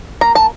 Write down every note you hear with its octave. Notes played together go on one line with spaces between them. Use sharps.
A#3 A#5
A5